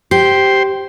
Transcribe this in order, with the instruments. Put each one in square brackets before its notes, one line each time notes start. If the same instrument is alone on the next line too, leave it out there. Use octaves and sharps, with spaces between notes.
[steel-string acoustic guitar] G4 [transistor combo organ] C5 C6